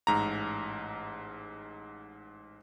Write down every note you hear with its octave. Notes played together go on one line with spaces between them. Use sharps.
A1 G#2 A#5